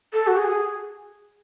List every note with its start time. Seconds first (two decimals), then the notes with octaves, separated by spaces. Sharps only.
0.13 A4
0.27 F#4
0.37 G#4